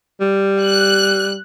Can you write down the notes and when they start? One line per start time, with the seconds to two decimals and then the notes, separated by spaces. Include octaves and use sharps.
0.20 G3
0.64 F#6